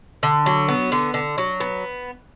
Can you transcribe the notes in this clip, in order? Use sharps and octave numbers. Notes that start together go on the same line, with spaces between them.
D3
F#3
B3
D3
D3
F#3
B3